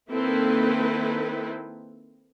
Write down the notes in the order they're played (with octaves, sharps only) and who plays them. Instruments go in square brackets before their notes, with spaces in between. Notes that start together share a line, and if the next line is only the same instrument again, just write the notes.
[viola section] D#3 A#3 C4 E4 A4 B4